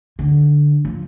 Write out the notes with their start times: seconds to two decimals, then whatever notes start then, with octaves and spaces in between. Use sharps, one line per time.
0.19 D3
0.85 F3